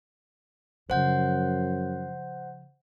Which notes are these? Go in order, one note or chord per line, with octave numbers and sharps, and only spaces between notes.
F#2 C#3 F3 C5 F#5 G6